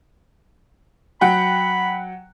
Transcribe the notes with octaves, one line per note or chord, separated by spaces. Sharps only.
F#3 F#5 G5 B5